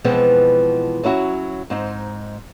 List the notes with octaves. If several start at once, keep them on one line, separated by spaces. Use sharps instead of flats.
B2 E3 F3 G#3 B3 C4
F#3 C#4 E4 F#4
G#2 C4 D#4